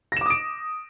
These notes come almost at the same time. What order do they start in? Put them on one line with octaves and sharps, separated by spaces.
A#6 E7 D6 D#6 D7